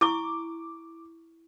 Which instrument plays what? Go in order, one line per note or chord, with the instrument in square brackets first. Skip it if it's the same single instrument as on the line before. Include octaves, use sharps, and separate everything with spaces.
[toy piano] E4 C#6 [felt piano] D6